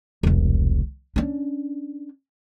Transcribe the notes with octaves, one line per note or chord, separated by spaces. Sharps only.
E1 C2
C#4 D4